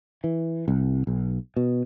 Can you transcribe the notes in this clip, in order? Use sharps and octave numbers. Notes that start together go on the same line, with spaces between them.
E3
C2
B1
B2